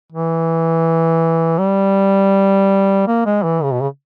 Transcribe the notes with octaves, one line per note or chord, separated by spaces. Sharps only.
E3
G3
A#3
G#3
E3
C#3
B2
C#3